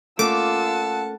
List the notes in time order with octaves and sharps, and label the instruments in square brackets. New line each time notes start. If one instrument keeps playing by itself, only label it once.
[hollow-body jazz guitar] A3 A#3 C#4 [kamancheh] F4 E6 [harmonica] F#5 A5 [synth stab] D6